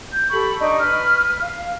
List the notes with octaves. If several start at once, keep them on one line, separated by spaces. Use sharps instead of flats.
G6
G4 A4 B5 C#6
D4 D#4 D#5 C#6
B4 F6
F5